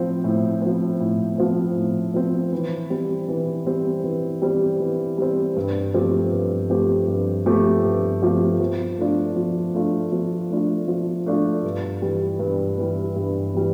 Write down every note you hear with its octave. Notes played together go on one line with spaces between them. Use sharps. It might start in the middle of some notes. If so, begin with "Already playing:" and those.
Already playing: A2 F3 C4
A2
F3 C4
A2
F3 C4
A2
F3 C4
E3
G3 C4
E3
G3 C4
E3
G3 C4
E3
G3 C4
G2
F3 A3 C4 G4
G2
F3 A3 C4 G4
G2
F3 A3 C4 G4
G2
F3 A3 C4 G4
F3
A3 D4 F4
F3
A3 D4 F4
F3
A3 D4 F4
F3
A3 D4 F4
G2
E3 G3
G2
E3 G3
G2
E3 G3